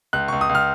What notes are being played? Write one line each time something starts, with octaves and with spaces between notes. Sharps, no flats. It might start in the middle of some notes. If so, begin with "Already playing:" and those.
C#2 F#6
C#2 C#6
D#6
C#2
F6